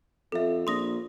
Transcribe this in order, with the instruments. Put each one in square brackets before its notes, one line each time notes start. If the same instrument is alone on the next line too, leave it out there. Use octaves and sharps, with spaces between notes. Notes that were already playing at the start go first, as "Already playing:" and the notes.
[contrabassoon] F2 [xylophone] A4 E5
[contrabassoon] A#1 [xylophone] C6 D#6 A#6